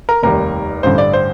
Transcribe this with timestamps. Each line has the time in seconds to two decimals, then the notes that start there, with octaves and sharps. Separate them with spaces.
0.09 A#4
0.23 F1 D#2 D#3 G3 A#4
0.83 A1 G2 D3 C5
0.98 D5
1.13 C5